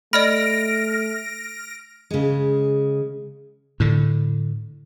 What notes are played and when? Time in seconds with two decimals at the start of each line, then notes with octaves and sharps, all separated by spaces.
0.13 A3 D5 D#5 B5 F6 A#6 D7
2.11 C#3 G#3
3.80 A2 D3